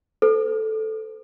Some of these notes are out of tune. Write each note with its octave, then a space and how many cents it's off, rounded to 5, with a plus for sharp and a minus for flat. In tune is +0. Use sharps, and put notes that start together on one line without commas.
A4 -5 C5 -40